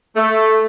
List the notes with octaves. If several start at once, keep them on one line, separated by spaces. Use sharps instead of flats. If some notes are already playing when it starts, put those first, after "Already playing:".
A3